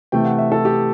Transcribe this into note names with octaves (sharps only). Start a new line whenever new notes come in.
C3 E3 A3 G5
F#5
E5
A4
G4